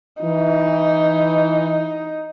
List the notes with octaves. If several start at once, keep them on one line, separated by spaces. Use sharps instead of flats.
E3 D#4